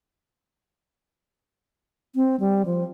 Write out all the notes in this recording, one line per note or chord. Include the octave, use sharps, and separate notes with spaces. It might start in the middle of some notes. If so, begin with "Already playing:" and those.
C4
G3
F3